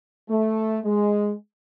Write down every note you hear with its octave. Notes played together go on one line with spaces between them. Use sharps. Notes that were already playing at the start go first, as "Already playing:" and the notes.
A3
G#3